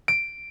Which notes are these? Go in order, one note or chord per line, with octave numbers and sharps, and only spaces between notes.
D7